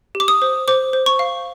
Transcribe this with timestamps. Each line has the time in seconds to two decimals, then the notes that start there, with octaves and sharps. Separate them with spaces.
0.15 G4
0.20 D6
0.28 D#6
0.42 C5
0.68 C5 D6
0.93 C5
1.06 C#6
1.19 F5